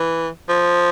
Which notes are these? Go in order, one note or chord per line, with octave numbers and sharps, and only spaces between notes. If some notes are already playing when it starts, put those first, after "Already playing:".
Already playing: E3
F3